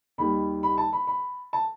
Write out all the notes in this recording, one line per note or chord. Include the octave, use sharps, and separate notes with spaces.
D#2 D#3 G3 B5
B5
A5
B5
B5
A5